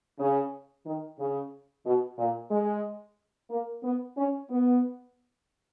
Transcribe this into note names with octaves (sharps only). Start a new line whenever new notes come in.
C#3
D#3
C#3
B2
A#2
G#3
A#3
B3
C#4
B3